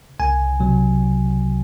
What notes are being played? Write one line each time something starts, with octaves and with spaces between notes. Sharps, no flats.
C2 G#5
C3 F#3